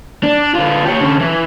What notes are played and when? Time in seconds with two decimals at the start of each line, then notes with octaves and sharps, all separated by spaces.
0.23 D4
0.55 D3 F4
0.86 G4 C#5
1.00 D3 C#4
1.21 E3